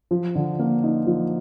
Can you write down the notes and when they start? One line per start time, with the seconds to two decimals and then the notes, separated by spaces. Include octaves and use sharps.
0.11 F3
0.35 D3
0.59 A#3
0.84 D#4
1.07 F3